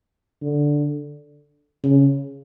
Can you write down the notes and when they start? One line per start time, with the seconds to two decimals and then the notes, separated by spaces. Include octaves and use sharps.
0.42 D3
1.84 C#3